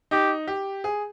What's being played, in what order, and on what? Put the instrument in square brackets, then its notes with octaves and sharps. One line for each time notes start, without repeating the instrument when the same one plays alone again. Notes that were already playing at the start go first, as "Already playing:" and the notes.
[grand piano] D#4 [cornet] G4
[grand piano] G4
G#4